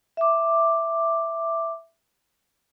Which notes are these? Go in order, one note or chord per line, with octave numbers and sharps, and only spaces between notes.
E5 D6